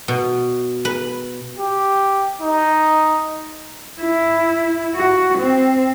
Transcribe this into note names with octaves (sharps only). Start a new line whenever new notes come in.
B2
B4
G4
D#4
E4
F#4
C4